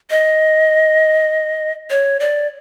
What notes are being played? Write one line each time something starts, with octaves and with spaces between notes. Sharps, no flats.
D#5
C#5
D5